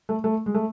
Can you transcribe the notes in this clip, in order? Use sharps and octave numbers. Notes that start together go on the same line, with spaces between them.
A3
A3
G#3
A3